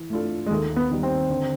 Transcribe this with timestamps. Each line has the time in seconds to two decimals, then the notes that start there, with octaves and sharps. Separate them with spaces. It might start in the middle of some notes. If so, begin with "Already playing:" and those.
Already playing: E3
0.10 A3 D4 F4 A4
0.46 G#3
0.50 D#2 A3
0.76 B3
0.90 D#3 G3
1.03 C4
1.30 D3